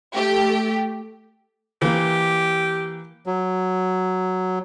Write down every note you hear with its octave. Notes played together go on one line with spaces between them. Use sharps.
A3 G4
E3 A#3 G4
F#3